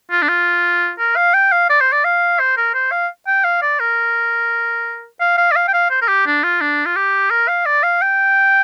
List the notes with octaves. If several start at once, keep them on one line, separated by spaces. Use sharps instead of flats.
F4
D4
F4
A#4
F5
G5
F5
D5
C5
D5
F5
C5
A#4
C5
F5
G5
F5
D5
A#4
F5
F5
D5
F5
G5
F5
C5
A#4
G4
D4
F4
D4
F4
G4
A#4
F5
D5
F5
G5